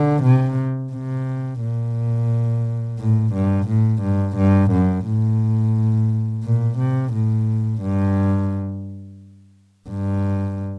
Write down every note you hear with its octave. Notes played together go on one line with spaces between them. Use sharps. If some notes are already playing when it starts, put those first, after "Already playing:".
Already playing: D3
C3
C3
A#2
A2
G2
A2
G2
G2
F#2
A2
A#2
C3
A2
G2
G2